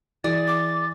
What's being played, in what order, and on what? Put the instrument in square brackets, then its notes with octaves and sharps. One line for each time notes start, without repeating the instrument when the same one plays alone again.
[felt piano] E3 [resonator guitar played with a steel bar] G#4 D5 [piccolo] A6
[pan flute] D6